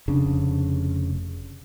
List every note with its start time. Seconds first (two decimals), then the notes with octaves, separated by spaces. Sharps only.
0.08 F1 C#3 D4